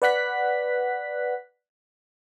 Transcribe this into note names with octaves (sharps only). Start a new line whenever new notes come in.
B4 D5 F#5 F#6 B6